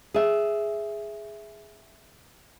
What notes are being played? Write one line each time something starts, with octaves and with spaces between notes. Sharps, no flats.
G#4 E5